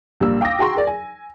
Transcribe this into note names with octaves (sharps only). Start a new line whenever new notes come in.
A#1 G3 A#3 E6
F5 G5 D6 D#6 A#6
F#4 G#4 G5 A#5 C6 C#6
G#4 A#4 D5
G#5